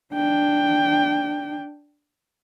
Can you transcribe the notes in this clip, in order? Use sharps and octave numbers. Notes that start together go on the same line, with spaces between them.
D4 G5